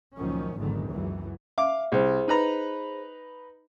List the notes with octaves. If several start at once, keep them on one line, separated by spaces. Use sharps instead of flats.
C#2 F#2 A#2 D#3 F3 C#4
G#1 E2 D3 D#3 F#3
C#2 F#2 E3 F#3
E5 F5 D6
C2 G#4 C5
D#4 B4 A#5